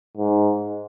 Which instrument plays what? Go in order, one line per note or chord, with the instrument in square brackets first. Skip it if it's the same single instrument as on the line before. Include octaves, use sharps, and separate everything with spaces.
[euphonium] G#2